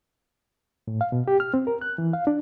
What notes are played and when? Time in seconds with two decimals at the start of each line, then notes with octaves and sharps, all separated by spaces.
0.88 A2
1.01 F5
1.12 B2
1.28 G4
1.40 F6
1.54 C4
1.67 A#4
1.81 F#6
1.98 E3
2.13 F5
2.27 D4